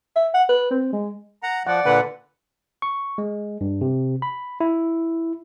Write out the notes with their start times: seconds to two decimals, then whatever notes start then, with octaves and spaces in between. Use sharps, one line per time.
0.16 E5
0.34 F#5
0.49 B4
0.71 C4
0.93 G#3
1.43 F#5 A#5
1.67 F3 D5 F#5
1.86 A#2 D3 B4 F#5
2.82 C#6
3.18 G#3
3.61 G2
3.81 C3
4.22 B5
4.60 E4